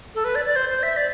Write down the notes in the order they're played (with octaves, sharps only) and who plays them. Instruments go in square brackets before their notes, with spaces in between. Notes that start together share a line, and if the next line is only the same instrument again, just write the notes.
[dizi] A4
B4
D5
D5
C5
C5
E5
D5